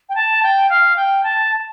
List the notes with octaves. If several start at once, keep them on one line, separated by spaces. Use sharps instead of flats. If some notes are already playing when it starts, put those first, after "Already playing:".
G5
A5
G5
F5
G5
A5